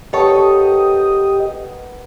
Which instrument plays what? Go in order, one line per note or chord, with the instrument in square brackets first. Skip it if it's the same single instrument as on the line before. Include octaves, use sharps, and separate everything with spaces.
[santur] B3 A#4 G5 [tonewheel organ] G4 D#5 [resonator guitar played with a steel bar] A4 C#5